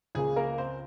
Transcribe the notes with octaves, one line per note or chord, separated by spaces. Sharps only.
C#2 C#3 F3 A#3 G#4
A#3 A#4
C4 C5